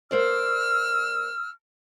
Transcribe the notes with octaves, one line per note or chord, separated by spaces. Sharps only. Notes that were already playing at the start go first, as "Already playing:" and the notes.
A#3 C5 D5 E6 F6